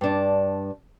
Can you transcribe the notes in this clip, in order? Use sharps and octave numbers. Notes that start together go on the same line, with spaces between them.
G2 D4